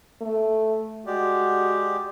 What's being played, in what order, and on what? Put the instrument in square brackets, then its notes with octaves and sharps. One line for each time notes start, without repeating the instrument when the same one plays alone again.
[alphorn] A3
[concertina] G#3 G4 D5 [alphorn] F#4